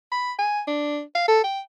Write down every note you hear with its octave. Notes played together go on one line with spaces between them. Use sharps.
B5
G#5
D4
F5
A4
G5